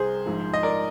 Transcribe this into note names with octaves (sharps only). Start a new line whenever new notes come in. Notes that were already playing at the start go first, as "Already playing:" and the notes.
Already playing: C2 C3 G#4 C5
A#1 G#2 F3
D#5
A#4 D5